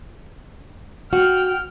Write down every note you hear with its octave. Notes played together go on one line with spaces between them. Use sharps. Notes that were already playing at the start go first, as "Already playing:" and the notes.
F#4 G5 F6